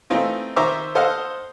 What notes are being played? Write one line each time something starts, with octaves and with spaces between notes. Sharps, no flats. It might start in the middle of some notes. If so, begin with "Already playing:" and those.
E3 A3 C4 D#4 F4
D#3 C5 E5 A#5 C#6 D6
A4 C5 D#5 F5 F#5 F6